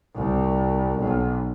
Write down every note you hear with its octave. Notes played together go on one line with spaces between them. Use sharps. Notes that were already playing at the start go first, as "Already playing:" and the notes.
C2
B1